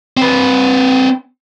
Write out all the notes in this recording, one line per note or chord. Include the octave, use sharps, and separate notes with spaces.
C4 B4